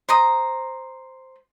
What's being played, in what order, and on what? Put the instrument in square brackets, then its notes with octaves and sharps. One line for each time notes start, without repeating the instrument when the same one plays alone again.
[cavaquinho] C5 A#5 D#6